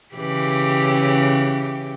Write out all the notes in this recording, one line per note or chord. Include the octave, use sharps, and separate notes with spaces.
C#3 E3 G4